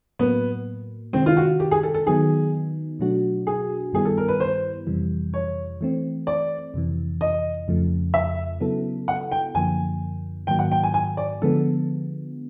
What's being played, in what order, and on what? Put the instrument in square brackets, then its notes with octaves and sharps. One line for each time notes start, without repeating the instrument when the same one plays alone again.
[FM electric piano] A2 F#3 A#3 [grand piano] B3
[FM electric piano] C3 D#3 G#3 [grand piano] C4
[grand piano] F4
F#4
G4
G#4
A4
A4
[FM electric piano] D#3 F#3 B3 D#4 [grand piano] G#4
[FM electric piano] B2 F#3 A3 D4 F#4
[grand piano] G#4
[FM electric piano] G2 D#3 G3 B3 E4 [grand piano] G#4
[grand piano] A4
A#4
B4
C5
[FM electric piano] F2 C3 E3 G3
[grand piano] C#5
[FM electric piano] E3 A3 C4
[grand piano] D5
[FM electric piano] F2 C3 E3
[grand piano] D#5
[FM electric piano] F2 C#3 F3 A3
[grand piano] E5
[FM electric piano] C#3 F#3 B3 E4 A4
[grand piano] F#5
G5
[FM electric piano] F#2 D3 F3 A#3 [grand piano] G#5
[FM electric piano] G#2 D#3 F#3 A#3 [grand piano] G5
[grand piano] F#5
G5
G#5
G#5
D5
[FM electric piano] D3 F3 G#3 B3 [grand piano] A4